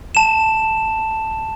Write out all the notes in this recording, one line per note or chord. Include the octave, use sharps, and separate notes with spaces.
A5 E7